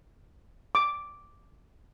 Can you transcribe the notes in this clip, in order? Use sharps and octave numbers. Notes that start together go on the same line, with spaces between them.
D6